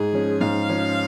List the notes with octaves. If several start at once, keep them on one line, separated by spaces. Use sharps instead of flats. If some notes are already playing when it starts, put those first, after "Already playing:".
Already playing: G#2 G#4
F3 C#4
G#2 F5
F3 C#4